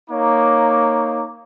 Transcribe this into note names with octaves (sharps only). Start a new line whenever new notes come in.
A#3 D#4 C#5 A#5 D6